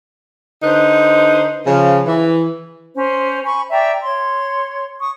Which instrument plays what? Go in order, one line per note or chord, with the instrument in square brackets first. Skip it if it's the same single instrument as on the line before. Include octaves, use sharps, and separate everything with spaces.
[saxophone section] D3 D#4 B4 C5
C#3 F3
E3
[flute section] C#4 C5
G#5 B5 C#6
D5 E5 G5 A#5
C#5 C6
C#6 D#6